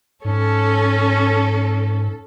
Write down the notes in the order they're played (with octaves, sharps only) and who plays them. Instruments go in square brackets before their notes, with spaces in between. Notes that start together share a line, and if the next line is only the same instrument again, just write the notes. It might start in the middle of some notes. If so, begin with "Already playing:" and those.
[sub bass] G#2 [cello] C#4 [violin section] A4